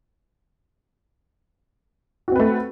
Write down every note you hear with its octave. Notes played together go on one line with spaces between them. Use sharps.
A3 C4 F#4 B4